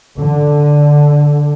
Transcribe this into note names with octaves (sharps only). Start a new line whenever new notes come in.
D3